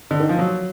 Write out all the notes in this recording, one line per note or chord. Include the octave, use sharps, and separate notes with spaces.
D3
D#3
F3
F#3